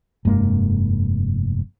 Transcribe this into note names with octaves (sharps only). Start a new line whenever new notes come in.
F1 G2 G#3 A#3